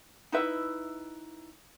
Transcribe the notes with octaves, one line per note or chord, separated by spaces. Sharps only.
D#4 E4 B4 E5